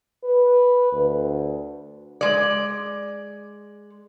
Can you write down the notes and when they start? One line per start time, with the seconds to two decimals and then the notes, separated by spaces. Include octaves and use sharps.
0.24 B4
0.93 D2
2.21 G#3 D5